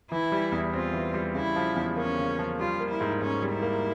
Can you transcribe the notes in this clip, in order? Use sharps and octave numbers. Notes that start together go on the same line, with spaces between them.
E3 E4
G3
E2
C4 F4
E3
G3
C#3 E4
F3
E2
A#3 C#4
C#3
F3
G3 F4
A#3
E4
G#2
G#2 C#4
G3
E4
A#3